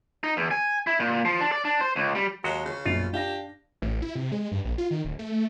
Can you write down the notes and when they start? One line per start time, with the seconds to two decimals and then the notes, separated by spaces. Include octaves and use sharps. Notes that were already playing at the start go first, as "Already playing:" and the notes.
0.23 D#4
0.37 E2
0.51 G#5
0.87 E4
1.00 A#2
1.25 F3
1.40 D4
1.52 D5
1.65 D4
1.81 C5
1.96 C#2
2.15 G3
2.44 D#2 F#3 G#3 F#4
2.65 C#3
2.85 A#1 F#2 B2 F4
3.13 D4 G4 F5 A#6
3.82 A1
4.02 E4
4.16 C3
4.32 G#3
4.52 G2
4.65 A#1
4.78 F4
4.91 D#3
5.05 D1
5.19 A3
5.31 A3